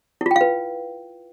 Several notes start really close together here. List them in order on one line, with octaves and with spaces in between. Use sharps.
E4 F4 G5 F5 B4